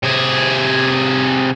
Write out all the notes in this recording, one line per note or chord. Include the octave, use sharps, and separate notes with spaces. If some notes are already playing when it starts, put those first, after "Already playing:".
C3 G#4